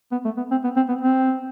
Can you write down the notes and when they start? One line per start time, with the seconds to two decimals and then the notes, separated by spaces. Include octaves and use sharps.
0.12 B3
0.25 A3
0.37 B3
0.51 C4
0.64 B3
0.76 C4
0.89 B3
1.01 C4